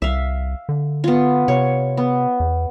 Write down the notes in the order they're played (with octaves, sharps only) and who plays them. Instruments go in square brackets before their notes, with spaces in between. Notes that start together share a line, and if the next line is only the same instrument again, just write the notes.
[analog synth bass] C2 [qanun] E5 F5
[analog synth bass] D3
[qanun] B3 F4
[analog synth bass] C3 [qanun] C#5
[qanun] B3
[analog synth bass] E2